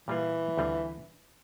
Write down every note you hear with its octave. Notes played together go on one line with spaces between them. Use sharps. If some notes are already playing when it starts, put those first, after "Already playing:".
A#2 E3 G3 A#3 F4
D2 D3 G3 C4 F4